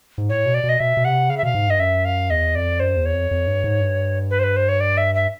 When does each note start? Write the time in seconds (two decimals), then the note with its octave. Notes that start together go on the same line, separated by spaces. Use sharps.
0.18 G#2
0.29 A2 C#5
0.46 B2
0.54 D5
0.64 B2
0.69 D#5
0.80 B2 E5
0.97 B2
1.05 C3 F#5
1.29 C#3 F5
1.37 E5
1.43 B2 F5
1.55 G#2
1.67 G2 D#5
1.80 F#2 E5
2.05 F5
2.30 E2 D#5
2.55 F2 D5
2.80 F#2 C5
2.96 E2
3.06 C#5
3.14 F2
3.31 F2
3.47 G2
3.64 G#2
3.81 G2
4.31 B4
4.39 C5
4.44 B4
4.56 C5
4.69 C#5
4.80 D5
4.97 E5
5.15 E5